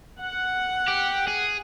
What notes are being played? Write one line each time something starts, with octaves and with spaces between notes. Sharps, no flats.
F#5
G4
G#4